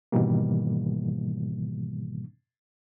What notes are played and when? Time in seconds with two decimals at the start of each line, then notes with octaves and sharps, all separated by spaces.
0.12 G#2 B2 D#3 E3 G3 A#3